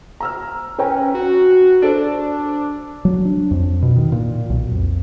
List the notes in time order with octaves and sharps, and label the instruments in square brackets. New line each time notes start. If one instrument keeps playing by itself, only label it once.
[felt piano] A#5 E6 F6
[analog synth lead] C#4 [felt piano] B4 G5 A#5
[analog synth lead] F#4
[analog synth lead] D4 [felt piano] A4 C5 D7
[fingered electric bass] F#3
D4
F2
B2
D#3
A#2
B1
F2